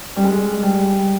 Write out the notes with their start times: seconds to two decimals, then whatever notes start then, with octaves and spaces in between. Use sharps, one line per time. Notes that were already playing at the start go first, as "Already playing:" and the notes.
0.16 G3
0.24 G#3
0.63 G3